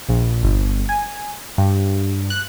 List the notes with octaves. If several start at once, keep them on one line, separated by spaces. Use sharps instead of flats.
A#1
G1
G#5
G2
F#6